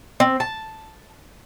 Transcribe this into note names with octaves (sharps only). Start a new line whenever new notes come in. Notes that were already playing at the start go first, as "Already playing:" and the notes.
C4
A5